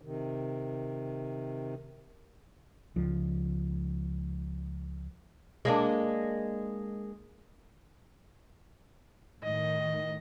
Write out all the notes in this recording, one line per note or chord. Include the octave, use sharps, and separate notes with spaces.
C3 D#3
C#2 F3
G#3 A#3 D4
A2 D#3 D#5